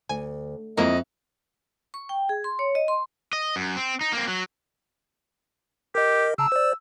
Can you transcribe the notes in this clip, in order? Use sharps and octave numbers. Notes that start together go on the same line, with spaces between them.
D2 G#5
F2 G#3 A#3 E4 D#5
C#6
G5
G#4
C6
C#5
D#5
C6
D#5
F#2
C4
D#4
A#3 C4
F#3
G4 A#4 D#5
C#3 A5 A#5 E6
C5 D5